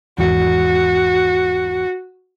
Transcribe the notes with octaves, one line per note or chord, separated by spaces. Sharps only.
G#1 E2 F#4